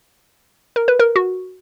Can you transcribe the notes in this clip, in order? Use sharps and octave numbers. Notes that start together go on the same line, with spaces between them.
A#4
B4
A#4
F#4